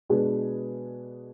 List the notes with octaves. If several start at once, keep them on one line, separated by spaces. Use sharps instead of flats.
B2 G#3 D4 G#4 B4